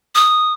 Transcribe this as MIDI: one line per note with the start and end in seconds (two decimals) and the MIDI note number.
0.15 0.53 87